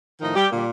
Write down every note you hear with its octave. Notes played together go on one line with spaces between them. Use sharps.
A2 D#3 F3 D#4
G3 G4
A#2 D3 G3 A#3